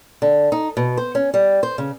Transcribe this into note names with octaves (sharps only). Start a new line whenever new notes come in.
D3
D#4
B2
C5
C#4
G3
C5
C#3